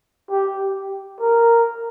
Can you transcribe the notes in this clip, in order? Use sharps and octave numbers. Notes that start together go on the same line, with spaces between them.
G4
A#4